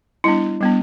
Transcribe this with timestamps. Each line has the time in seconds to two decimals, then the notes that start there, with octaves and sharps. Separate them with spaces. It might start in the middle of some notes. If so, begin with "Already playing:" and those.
0.24 G3 B3 D4 E4
0.61 G3 B3 D4